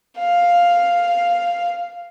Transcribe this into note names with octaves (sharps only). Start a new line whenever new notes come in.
F5